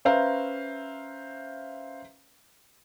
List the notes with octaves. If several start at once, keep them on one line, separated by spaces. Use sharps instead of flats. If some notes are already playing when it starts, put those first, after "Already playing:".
C#4 B4 C5 E5 F5 A#5